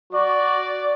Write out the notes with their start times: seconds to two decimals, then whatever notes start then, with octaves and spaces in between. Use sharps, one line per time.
0.12 F#4 D5